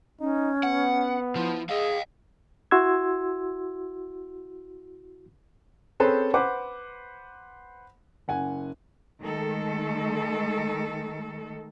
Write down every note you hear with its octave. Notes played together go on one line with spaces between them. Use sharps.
C#4 D#4
B3 F#5
F3 E4 F4
G#4 D#5 F5
E4 F#4 C6 E6 G#6
C4 C#4 G#4 A4 B4 C5
B4 C5 F#5 D6
F#1 F#5 G#5
D#3 G#3 A3 A4